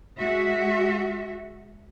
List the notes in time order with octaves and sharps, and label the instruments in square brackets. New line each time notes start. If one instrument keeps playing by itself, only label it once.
[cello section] G#3 F#4 E5